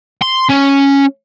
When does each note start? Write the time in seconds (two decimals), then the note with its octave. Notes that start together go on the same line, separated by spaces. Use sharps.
0.22 C6
0.49 C#4